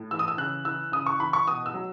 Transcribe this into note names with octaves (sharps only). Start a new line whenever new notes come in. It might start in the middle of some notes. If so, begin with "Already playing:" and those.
Already playing: A2
E3 E6
D#6
E6
C#3 F#6
E3 E6
C#3 D#6
C#6
E3 B5
C#6
B2 D#6
E6
F#3